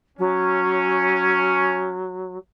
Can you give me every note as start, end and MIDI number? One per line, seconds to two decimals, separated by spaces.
0.18 2.37 54
0.18 1.98 61